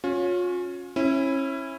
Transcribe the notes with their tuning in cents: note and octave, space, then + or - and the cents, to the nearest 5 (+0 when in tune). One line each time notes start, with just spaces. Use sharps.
C#4 +0 F4 +40
C#4 -30 E4 +0